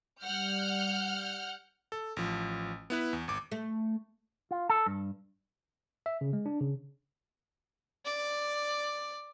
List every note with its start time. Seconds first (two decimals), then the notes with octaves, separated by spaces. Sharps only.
0.22 G3 F#5 F6 G6
1.92 A4
2.17 A1 F3
2.90 B3 E4 B4
3.13 E2
3.28 G#1 D6
3.52 A3
4.51 F4
4.69 A4
4.86 G2
6.06 E5
6.21 C#3
6.33 G#3
6.46 D4
6.61 C#3
8.06 D5